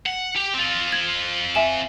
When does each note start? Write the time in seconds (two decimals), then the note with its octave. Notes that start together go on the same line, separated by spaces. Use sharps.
0.06 F#5
0.36 G4
0.54 C4 F4
0.92 G#6
1.55 E5 G#5 E7